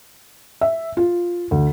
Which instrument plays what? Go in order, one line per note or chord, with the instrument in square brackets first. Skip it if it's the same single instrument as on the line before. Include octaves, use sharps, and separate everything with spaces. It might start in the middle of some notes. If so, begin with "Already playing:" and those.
[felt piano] E5
F4
D2